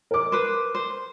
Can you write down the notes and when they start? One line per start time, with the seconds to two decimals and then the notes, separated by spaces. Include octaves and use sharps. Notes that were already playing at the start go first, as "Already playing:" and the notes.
0.11 A#4 D6
0.32 B4 C5
0.75 C5